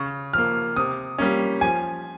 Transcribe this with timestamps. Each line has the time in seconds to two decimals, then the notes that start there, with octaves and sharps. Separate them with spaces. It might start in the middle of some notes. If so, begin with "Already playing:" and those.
Already playing: C#3 C#6
0.33 F3 A#3 F6
0.76 C3 D#6
1.18 G3 A#3 C#4
1.61 F3 G#5